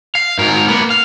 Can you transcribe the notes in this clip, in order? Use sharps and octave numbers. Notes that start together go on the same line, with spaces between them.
F5
G#2 A#4
A#3 B3
F5